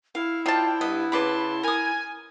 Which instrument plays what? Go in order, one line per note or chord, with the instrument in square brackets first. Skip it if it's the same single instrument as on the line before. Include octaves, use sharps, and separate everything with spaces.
[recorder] E4 [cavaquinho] F5
[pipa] D#3 A5 [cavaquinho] F4 [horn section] C5 D5 G5
[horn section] G2 [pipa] B3 [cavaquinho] D#5
[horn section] C#3 A5 C6 [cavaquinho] B4 D5 B5
[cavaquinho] A#4 D#6 [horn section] G#5